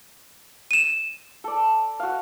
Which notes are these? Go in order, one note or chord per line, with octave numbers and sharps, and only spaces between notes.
D#7 E7
A4 D5
F#4 F5